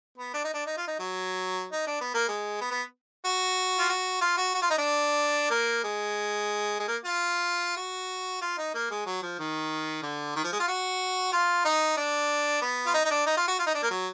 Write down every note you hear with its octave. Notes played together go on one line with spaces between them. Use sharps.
B3
D4
D#4
D4
D#4
F4
D#4
F#3
D#4
D4
B3
A#3
G#3
B3
B3
F#4
F4
F#4
F4
F#4
F#4
F4
D#4
D4
A#3
G#3
G#3
A#3
F4
F#4
F4
D#4
A#3
G#3
F#3
F3
D#3
D3
D#3
F3
G#3
F4
F#4
F4
D#4
D4
B3
F4
D#4
D#4
D4
D#4
F4
F#4
F4
D#4
D4
A#3
F#3